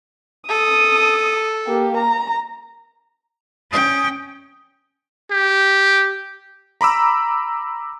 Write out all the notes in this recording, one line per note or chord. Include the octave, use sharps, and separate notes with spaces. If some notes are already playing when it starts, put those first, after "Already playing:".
A4 D#6
A#3 G4
A#5
C#4 G5 D#6
G4
A#5 B5 D6 E6